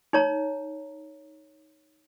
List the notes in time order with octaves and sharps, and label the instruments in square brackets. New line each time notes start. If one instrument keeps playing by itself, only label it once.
[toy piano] D#4 C#5 A#5